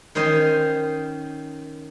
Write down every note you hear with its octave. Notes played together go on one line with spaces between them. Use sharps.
D#3 C#4 C5 D#5 C6